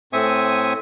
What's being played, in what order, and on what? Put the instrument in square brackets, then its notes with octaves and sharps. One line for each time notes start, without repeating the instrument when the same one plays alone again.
[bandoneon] A2 C4 E5 G#5 C#6 D#6